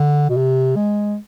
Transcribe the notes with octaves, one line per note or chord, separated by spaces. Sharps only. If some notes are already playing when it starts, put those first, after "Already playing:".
Already playing: D3
B2
C3
G#3